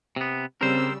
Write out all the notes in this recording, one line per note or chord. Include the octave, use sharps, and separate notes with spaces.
C3 B3
C#3 G3 C4 A#4 C5 E6